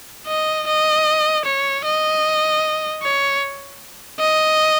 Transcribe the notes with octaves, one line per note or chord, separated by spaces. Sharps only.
D#5
D#5
C#5
D#5
C#5
D#5